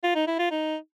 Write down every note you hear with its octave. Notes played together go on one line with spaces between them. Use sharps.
F4
D#4
E4
F4
D#4